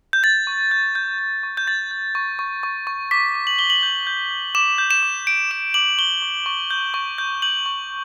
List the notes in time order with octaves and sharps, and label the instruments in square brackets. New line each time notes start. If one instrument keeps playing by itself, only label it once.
[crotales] G6
G6 A6
C#6
G6
G6
G6
C#6
G6
C#6 A6
G6
C#6
C#6
C#6
C#6
D6 B6
D6
F#7
D6 G7
F#7
G6
G6
G6
D6 E7
G6
E7
D6
G6 D7
D6 E7
D6 F#7
C#6 G7
C#6
C#6
G6
C#6
G6
G6 F#7
C#6